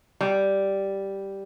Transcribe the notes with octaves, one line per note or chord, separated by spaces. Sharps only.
G3